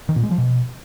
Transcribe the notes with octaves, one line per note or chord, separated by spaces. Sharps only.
D#3
A#2
G#3
F3
B2